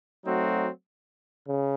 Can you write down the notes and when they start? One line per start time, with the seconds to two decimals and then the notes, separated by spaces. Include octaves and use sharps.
0.25 F#3 A3 C4 D#4 F#4
1.46 C#3